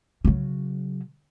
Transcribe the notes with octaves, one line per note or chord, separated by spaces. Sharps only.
C#3 F#3